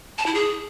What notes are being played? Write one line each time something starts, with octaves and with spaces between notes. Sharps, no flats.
A5
E4
G#4